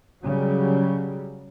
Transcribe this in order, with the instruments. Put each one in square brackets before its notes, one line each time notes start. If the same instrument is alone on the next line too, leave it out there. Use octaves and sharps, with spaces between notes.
[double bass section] C#3 F#3 G3